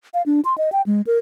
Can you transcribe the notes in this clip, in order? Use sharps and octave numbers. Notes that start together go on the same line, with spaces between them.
F5
D4
C6
D#5
G5
G#3
A#4